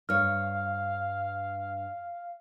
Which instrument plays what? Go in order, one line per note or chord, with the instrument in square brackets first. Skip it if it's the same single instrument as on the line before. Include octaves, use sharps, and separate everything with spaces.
[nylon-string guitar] G2 C#5 [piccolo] F5 [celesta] F6